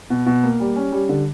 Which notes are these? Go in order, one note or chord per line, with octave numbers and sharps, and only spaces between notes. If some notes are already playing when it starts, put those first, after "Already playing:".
B2
B2
A#3
G3
C#4
G3
D3